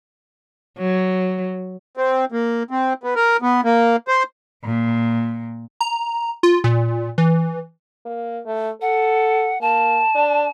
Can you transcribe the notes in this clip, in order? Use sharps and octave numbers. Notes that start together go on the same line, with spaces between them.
F#3
C4
A#3
C4
B3
A#4
B3
A#3
C5
A#2
A#5
F4
A#2
E3
A#3
A3
A4 F#5
A#3 A5
D4